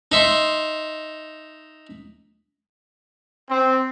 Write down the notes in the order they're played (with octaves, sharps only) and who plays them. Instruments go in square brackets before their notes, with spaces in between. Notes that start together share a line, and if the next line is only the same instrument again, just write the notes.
[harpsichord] D#4 E5 C6
[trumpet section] C4